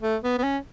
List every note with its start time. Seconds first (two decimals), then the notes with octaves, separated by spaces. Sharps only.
0.02 A3
0.24 B3
0.38 B3
0.43 C#4